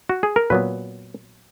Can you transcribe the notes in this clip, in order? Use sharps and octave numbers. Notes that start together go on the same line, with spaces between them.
F#4
G#4
A#4
A#2 F#3 B3 B4